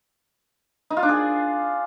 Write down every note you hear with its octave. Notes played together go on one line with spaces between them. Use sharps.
D#4
F4
D4
G#4